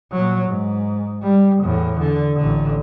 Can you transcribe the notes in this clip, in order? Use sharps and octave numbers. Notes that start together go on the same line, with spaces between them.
A#2 F#3
G#2
G3
E2 A2
D3
A1 D3